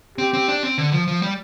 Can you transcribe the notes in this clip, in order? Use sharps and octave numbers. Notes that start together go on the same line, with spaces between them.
C4 G4
C4
D4
C4
D3
F3
F3
G3